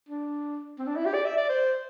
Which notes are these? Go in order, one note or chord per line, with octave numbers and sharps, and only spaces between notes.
D4
C4
D4
E4
G4
D5
E5
D5
C5